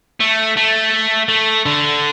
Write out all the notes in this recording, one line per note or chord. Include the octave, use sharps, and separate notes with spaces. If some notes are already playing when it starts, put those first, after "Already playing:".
A3
A3
A3
D3